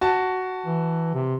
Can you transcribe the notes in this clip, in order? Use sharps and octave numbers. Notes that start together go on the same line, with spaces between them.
F#4 A5
E3
C3